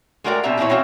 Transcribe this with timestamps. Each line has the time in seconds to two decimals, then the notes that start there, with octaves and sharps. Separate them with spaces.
0.24 G#3 A3 F#4 A#4 D5 G5
0.43 B2 C4 D4 E5 A#5
0.58 A#2 E3 C4 E4 C#5
0.69 E3 C4 C#4 F#4 E5 F5